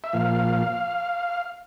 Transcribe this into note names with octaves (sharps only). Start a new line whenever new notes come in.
E5
A#2 F3 F5